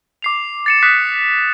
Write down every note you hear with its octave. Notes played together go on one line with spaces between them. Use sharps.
D6 C7 F7
A6 C#7 E7
D6 D#6 F#6 B6